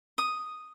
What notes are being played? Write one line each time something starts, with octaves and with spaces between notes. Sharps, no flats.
D#6